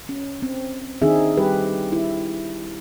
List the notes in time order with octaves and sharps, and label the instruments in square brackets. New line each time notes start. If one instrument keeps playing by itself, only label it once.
[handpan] C#4
C4
D#3 C4 D4 D#4 G#4 E5
G3 G4 B4
E4